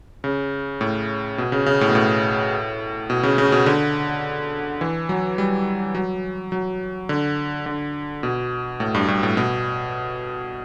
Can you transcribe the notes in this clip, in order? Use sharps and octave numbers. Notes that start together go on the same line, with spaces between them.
C#3
A2
B2
C#3
C#3
A2
B2
A2
B2
C#3
C#3
B2
D3
E3
F#3
G3
F#3
F#3
D3
D3
B2
A2
G2
G2
A2
B2